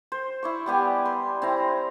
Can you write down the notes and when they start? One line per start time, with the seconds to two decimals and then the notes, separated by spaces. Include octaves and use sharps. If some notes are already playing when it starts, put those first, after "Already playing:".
0.12 C5
0.43 E4 D5 C#6
0.66 G3 B3 G4 G#5
1.05 C6
1.42 C4 E4 A#5